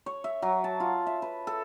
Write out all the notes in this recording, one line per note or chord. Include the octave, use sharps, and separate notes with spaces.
C#5
E5
F#3
A5
F4
E5
B4
A4